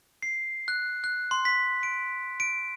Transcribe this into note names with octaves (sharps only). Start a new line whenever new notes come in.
C7
F#6
F#6
C6
B6
D7
D7